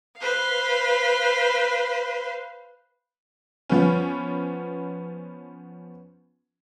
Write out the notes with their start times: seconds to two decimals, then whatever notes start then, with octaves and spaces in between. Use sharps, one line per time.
0.18 B4 C5 F5
3.69 F3 B3 C#4